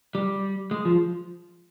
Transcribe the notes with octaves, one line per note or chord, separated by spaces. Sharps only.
G3
G#3
F3